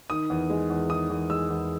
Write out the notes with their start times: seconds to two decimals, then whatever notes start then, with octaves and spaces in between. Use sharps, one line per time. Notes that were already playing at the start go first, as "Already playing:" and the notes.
0.10 D#3 D#6
0.30 E2
0.50 G#3
0.70 E2
0.90 D#3 D#6
1.10 E2
1.30 G#3 E6
1.50 E2